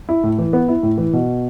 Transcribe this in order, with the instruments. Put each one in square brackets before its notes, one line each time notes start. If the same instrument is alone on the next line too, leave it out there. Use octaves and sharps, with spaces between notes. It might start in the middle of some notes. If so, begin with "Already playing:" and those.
[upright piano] E4
A2
E3
B3
E4
A2
E3
B2